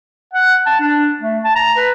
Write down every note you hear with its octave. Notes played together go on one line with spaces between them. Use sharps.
F#5
A5
D4
A3
A5
A#5
B4